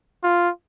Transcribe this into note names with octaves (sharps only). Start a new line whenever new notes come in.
F4